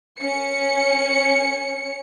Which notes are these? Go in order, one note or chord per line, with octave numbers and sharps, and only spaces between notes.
C#4 C#7